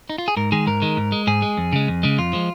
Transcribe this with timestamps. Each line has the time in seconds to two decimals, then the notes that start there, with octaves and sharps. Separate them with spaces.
0.09 D#4
0.18 F4
0.28 G#4
0.37 G#2 A#4
0.52 D#3 G#3 G#4
0.67 G#2 A#4
0.82 D#3 G#3
0.97 G#2
1.12 G#3
1.27 G#2 G#4
1.42 G#3
1.57 F2
1.73 C#3 G#3
1.88 F2
2.03 C#3 G#3
2.18 F2 F4
2.33 F3 G#3